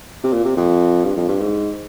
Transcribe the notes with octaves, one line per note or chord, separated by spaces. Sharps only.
C3
A#2
C3
F2
G2
F2
G2
G#2